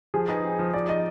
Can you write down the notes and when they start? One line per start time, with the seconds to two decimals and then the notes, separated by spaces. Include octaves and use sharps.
0.14 F3 G#4
0.29 D#4 B4
0.44 C4
0.59 F3
0.74 F3 D5
0.89 D#4 D#5